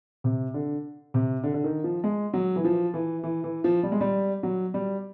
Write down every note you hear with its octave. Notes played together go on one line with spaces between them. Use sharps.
C3
D3
C3
D3
D3
D#3
F3
G#3
F#3
E3
F3
E3
E3
E3
F3
G3
G#3
G3
F#3
G3